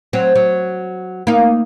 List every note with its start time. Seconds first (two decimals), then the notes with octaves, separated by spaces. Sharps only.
0.13 F#3 C4
0.35 F#3
1.27 A#3 D#4